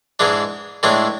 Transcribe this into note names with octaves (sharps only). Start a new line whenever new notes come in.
G#2 E3 G#3 D4
A2 E3 G#3 D4